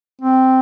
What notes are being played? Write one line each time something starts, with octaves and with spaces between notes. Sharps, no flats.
C4